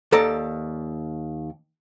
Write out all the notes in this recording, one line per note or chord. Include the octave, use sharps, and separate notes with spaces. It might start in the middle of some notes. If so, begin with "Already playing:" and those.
D#2 A4 D5 A#5